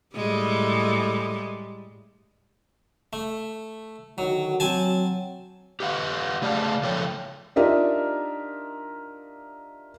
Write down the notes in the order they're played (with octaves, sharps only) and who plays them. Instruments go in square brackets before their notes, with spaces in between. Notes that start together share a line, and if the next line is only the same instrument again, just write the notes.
[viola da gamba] A2 G3 G#3
[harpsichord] A3
[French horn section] D3 D#3 F#4 [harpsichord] F#3
[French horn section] F#3 [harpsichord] C4 G#5 A5
[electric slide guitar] G4 B4 F5 F#5
C#3 A3 G#4 D5 F5 A5
C#3 F3 A4 C#5 G5
[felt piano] D4 D#4 F4 G4 A#4 E5